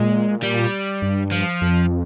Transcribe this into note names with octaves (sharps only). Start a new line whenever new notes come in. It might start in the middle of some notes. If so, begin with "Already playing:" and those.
Already playing: A#2 G#3
G3
G2
F3
F2